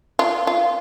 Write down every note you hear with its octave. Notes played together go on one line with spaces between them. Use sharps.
F4
F4